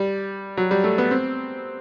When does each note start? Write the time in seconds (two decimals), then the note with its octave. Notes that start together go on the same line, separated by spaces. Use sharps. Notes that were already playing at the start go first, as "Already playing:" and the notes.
Already playing: G3
0.57 F#3
0.71 G3
0.84 A3
0.98 B3
1.11 C4